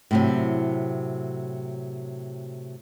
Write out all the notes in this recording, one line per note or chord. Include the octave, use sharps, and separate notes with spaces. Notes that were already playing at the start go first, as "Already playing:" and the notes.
A2 C3 F#3